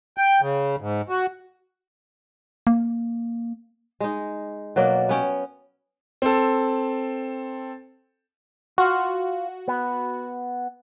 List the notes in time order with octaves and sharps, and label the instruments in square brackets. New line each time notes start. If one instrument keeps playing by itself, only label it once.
[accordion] G5
C#3
G#2
F#4
[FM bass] A#3
[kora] G#3 D#4
B2 F#3 A#3 D5
B3 C#4 G5
[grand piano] C4 A4
[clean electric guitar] F4 [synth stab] F#4
[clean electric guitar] B3